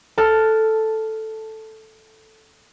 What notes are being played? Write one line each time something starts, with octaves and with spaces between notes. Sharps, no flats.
A4 A5 F6 F#6